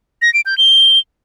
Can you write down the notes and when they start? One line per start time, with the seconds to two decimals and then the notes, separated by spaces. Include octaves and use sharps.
0.22 A#6
0.34 D7
0.46 G6
0.58 G7